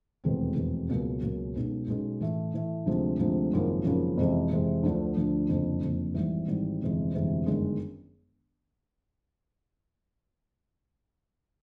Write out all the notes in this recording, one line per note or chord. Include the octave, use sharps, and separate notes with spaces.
F1 E2 B2 G#3 C4
F1 E2 B2 G#3 C4
C#2 B2 F#3 A#3 C#4
C#2 B2 F#3 A#3 C#4
B1 B2 G#3 C#4
B1 B2 G#3 C#4
A2 E3 A3
A2 E3 A3
D2 C3 F3 G#3
D2 C3 F3 G#3
G#1 F#2 C#3 F3 A#3
G#1 F#2 C#3 F3 A#3
F2 C3 E3 G#3
F2 C3 E3 G#3
D2 D3 F3
D2 D3 F3
F#1 F2 D3 F3
F#1 F2 D3 F3
G#1 G#2 E3 G3
G#1 G#2 E3 G3
G1 F2 C3 E3 G#3
G1 F2 C3 E3 G#3
G1 F#2 D#3 G#3